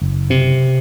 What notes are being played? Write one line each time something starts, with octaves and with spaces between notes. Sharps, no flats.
F#1
C3